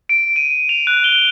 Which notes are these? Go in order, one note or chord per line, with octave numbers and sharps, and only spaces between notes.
D7
D#7
F7
F#6
G7